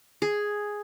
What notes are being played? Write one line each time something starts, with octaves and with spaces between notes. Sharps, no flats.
G#4